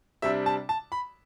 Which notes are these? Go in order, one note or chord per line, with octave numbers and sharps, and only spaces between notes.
C3 G3 D4 E5
A5
A5
B5